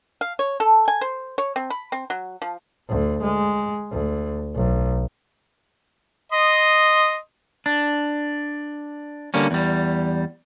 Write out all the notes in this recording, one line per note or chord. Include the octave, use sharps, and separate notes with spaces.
F5
C#5
A4
G#5
C5
C#5
C4
B5
C4
F#3
F3
D2
G#3
D2
B1
D#5 C6 D#6
D4
D3 G3 A#3 C#4
E2 G3